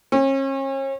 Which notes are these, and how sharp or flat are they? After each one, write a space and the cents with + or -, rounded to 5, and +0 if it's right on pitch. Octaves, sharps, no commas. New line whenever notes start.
C#4 -40